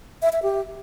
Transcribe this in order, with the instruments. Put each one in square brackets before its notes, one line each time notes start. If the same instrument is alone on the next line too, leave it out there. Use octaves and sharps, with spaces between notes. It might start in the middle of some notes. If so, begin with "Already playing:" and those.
[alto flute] E5
E5
G4